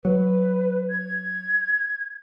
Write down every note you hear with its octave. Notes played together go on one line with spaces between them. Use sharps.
F#3 B4
G#6